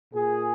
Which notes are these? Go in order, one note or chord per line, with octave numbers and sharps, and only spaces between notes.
A#2 G#4